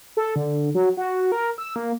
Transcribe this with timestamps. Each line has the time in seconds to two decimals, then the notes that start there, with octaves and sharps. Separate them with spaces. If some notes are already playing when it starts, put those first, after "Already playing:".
0.17 A4
0.36 D3
0.75 F#3
0.97 F#4
1.32 A#4
1.58 E6
1.76 A#3